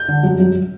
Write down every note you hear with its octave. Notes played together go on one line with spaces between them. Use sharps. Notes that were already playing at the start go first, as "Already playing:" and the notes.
Already playing: G6
D3
F#2
F#2